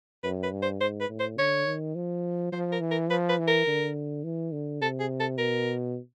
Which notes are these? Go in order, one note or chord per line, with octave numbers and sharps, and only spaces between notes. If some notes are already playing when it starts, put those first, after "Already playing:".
F#2 B4
B4
G2
C5
G#2 C5
B4
A2
C5
D3 C#5
D#3
F3
F3 C5
A#4
E3
A#4
F3 B4
B4
E3
A#4
D3
E3
D3
C3 A4
G#4
A4
B2 A#4